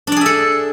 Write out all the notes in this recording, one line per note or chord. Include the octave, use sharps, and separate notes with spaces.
D4 G#4 A4 D5 E5